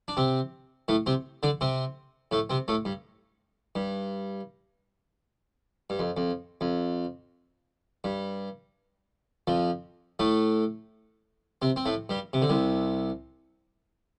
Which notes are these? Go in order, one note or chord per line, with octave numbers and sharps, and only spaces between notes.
D4
C3 C4
A2 A3
C3 C4
D3 D4
C3 C4
A2 A3
C3 C4
A2 A3
G2
G2
G2
F2
F2
F2
G2
F2 F3
A2 A3
C3 C4
C4
A2 A3
G2 G3
C3
D3
C2 C3